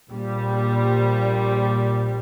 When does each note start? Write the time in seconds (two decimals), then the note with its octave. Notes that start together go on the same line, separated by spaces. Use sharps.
0.11 A#1 A#2 G3